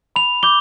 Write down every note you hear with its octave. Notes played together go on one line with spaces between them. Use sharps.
B5 F7
D6 G6 G7